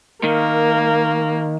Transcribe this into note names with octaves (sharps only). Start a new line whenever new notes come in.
D#3 A#3